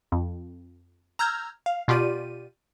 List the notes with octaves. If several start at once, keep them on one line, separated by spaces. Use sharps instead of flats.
F2
A#5 E6 F6 G6 G#6
F5
B2 F4 G4 D5 D#7